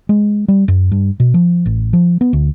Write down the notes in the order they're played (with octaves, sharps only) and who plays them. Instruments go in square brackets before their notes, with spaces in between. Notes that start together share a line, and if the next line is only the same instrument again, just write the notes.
[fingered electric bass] G#3
G3
F#2
G2
B2
F3
A1
F3
B3
D2